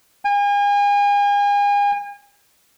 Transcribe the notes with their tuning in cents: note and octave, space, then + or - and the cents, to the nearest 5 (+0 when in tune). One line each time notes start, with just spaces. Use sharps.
G#5 -35